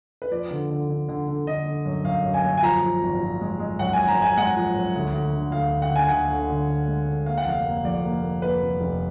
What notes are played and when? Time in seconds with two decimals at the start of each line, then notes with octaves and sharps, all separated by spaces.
0.22 B4
0.31 F3 D5
0.51 D3
0.70 D3
0.89 D3
1.08 D3
1.28 D3
1.47 D3 D#5
1.66 D3
1.86 F#2
2.05 F#2 F5
2.24 F#2
2.34 G#5
2.44 F#2
2.58 G#5
2.63 F3 A#5
2.82 F3
3.02 G#1
3.20 F3
3.41 G#3
3.59 G#3
3.79 F#2 F#5
3.93 G#1 G#5
4.08 A#5
4.17 G#3 G#5
4.37 G#3 F#5
4.56 F3
4.75 F#2
4.95 D2
5.14 D2
5.33 D3
5.52 D2 F5
5.72 D3
5.82 F#5
5.91 D3 G#5
6.09 D2 F#5
6.30 D3
6.50 D3
6.68 D2
6.88 G#3
7.08 D3
7.26 A#3 F5
7.38 F#5
7.46 F1 F5
7.66 A#3
7.85 F2 D5
8.04 A#3
8.23 A#3
8.42 A#3 B4
8.62 F1
8.81 F1